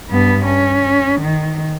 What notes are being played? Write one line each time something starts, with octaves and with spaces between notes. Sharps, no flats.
G2 B3
C#4
D#3